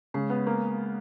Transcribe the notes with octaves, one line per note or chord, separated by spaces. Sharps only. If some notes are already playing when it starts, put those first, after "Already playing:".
C#3 G#3
B3
A#3